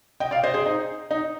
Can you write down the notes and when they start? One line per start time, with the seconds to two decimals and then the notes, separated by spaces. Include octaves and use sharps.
0.20 D#5 G5
0.31 D5 F5
0.44 C5 D#5
0.54 G#4 C5
0.66 D#4
1.11 D#4